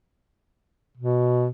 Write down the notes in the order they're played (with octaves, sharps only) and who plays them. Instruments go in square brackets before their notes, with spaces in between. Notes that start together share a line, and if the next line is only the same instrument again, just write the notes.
[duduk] B2